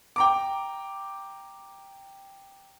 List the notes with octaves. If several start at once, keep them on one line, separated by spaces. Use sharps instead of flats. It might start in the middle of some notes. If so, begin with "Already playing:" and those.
G5 A#5 D6